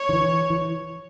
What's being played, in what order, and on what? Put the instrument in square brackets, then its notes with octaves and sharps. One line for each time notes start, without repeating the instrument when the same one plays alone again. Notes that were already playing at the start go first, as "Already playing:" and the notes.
Already playing: [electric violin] C#5
[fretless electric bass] D#3
E3
E3